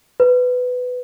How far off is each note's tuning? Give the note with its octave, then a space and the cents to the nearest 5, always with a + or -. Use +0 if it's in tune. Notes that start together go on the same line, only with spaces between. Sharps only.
B4 +15